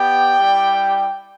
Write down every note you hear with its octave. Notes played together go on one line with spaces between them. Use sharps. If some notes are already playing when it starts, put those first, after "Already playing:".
Already playing: B3 G4 D5 G5
G3 E4 G4